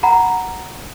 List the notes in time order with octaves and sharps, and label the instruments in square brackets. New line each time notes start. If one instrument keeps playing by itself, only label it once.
[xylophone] F#5 A#5 B5